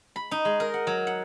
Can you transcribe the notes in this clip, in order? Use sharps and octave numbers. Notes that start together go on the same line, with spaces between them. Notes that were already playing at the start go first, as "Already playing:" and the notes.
B5
D#4
G#3
A#4
F#5
F#3
F#5